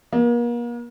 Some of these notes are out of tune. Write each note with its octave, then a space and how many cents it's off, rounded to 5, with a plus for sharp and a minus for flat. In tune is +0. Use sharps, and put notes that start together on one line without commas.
A#3 +40